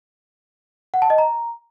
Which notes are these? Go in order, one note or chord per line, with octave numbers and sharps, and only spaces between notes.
F#5
A5
D#5
A#5